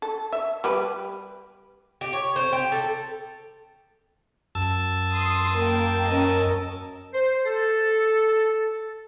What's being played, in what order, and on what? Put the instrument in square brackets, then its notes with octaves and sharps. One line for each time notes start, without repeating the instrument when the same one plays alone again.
[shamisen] A4
E5
G3 G4 B4
[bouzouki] G4
C#5
C5
G4
A4
[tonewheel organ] F#2 A5 E6
[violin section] C6 D#6
A#3 G5
C#4 A#4 D#5
[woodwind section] C5
A4